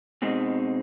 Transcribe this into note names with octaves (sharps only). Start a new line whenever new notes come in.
B2 G#3 C4 D#4